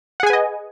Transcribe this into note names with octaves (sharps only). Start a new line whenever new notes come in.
G#4 B4 D#5 F#5 G#5